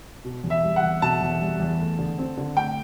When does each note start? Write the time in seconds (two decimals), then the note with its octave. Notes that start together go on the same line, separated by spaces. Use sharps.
0.24 B2
0.44 E2
0.50 E5
0.64 G3
0.76 F#5
0.83 E2
1.02 B2 A5
1.21 E2
1.41 G3
1.60 E2
1.79 A3
1.99 D3
2.18 C4
2.37 D3
2.57 A3 G5